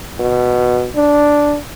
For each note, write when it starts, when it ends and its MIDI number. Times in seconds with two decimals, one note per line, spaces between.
0.19 0.86 47
0.96 1.57 62